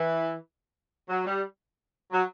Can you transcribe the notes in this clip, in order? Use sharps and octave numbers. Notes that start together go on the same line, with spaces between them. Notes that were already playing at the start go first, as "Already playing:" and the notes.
Already playing: E3
F#3
G3
F#3